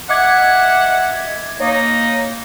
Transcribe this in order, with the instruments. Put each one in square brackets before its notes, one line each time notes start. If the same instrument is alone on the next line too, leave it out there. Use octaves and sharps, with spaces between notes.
[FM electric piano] D#5 D6 G#6 [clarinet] E5 [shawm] F#5
[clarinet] A#3 [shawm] D#4 [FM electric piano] C#5